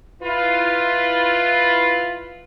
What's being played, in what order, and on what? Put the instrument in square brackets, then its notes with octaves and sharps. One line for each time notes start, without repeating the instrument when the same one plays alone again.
[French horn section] E4 F4 B4